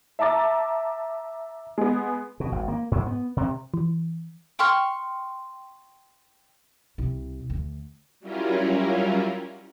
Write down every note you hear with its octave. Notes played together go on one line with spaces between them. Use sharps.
E5 A5 A#5 D6 A6
G#3 B3
B2
G#1
A#3
G#2
B3
C3
E3
G5 C6 C#6 F6
C2
D2
F#3 G3 C#4 E4 F4 A#4